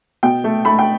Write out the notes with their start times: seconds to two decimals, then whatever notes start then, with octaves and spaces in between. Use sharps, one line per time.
0.23 B2 G5
0.44 A3
0.65 A3 B5
0.79 G5